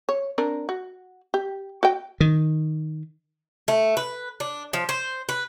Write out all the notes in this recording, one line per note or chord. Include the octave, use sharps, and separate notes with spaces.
C#5
C4 D4 A#4
F#4
G4
F#4 D#5 G5
D#3
A3
B4
D4
F3
C5
B4